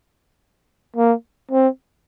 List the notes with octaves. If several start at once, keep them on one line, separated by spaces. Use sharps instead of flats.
A#3
C4